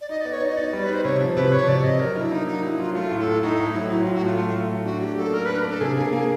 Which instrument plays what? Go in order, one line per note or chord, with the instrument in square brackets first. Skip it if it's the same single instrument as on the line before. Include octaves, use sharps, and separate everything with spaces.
[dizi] D5
[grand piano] D#4 [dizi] D#5
[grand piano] B3 [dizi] D5
[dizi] C#5
[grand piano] D#4 [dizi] D#5
[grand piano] D#4 [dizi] D5
[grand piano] G3
[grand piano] D#4 [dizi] B4
[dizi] C5
[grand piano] C3 [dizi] C#5
[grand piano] F3
[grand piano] C3 [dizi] B4
[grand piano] F3 [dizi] C#5
[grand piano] C3 [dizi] D5
[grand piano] C3 [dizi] D#5
[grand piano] F#3 [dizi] A#4
[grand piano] D4 [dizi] E4
[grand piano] A#3 [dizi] D#4
[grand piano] F#3 [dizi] D#4
[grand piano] F#3 [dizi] E4
[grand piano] F#3 [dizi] F4
[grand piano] A3 [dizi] F4
[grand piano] A2
[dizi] A4
[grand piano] A2
[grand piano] A2 [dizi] D#4
[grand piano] A2
[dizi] E4
[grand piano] F#3
[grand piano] F#3 [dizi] E4
[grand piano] A2 [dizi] F4
[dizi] F#4
[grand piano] A3 [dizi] F4
[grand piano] A3
A3
A3
[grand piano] D4 [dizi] F#4
[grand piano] F#3 [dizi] G4
[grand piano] A#3 [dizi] A4
[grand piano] D4 [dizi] A#4
[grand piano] D4 [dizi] B4
[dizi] A#4
[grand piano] D4 [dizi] A4
[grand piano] C3 [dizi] G#4
[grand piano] A#3 [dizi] G#4
[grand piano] A#3 [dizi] G#4